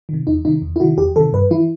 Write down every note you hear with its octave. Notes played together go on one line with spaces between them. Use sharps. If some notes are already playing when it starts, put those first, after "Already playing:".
C3 D#3
E2 D#4
C3 D#3 D#4
E2
E4
C3 D#3 F#4
E2 G4
C3 D#3 A4
G2 B4
E3 E4